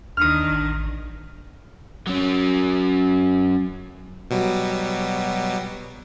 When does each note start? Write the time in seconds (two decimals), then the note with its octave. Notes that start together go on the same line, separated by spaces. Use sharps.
0.17 D#2 D#3 D4 D#6 F6
0.50 A1
2.07 F#3 C#4
4.31 B2 F#3 G3